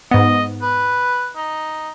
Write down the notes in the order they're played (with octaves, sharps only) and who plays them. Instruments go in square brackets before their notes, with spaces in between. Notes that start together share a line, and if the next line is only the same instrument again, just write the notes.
[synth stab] G#2 B3 [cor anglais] D#5
[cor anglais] B4
D#4